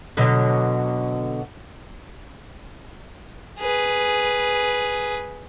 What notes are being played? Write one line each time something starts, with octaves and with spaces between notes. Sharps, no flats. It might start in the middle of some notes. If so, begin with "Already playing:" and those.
B2 D3 F#3
G#4 B4